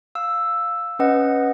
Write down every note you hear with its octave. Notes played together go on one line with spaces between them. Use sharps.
F5 E6
C#4 B4 D#5 F#5